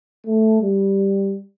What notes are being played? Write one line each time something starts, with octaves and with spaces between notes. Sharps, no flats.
A3
G3